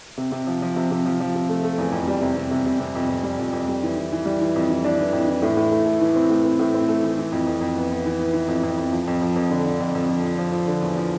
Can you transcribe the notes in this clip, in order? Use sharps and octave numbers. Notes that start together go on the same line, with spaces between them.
C3
C3
F3
F3
C3
C3
F3
F3
C3
A3
A3
E2
F2
G3
C3
C3
C3
C3
C3
F2
F2
G3
F2
F2
G3
E3
E3
E3
G3
E3
F2
E3
D4
E3
F2
E3
A2
A2
A3
A3
E3
C4
A2
C4
A2
C4
A3
E3
E3
F2
F2
F2
B3
B3
E3
B3
E3
F2
F2
F2
F3
F2
F3
F2
D3
D3
F2
F2
F3
F3
F3
F3
D3
E2
F3